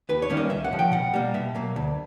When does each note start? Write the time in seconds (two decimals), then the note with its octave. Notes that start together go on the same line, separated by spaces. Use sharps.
0.09 D#2 B4
0.22 C#5
0.30 D#3 G3 A#3 C#4
0.37 D#5
0.50 C#2 E5
0.64 F#5
0.72 C#3 F3
0.79 G5
0.92 B2 F#5
1.14 G3 A#3
1.34 B2 E5
1.55 F#3 A#3
1.76 D2